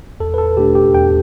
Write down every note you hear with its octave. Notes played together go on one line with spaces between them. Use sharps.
E2 A4
B4
A4
B2 A3 D4 G4
G4
E2 G5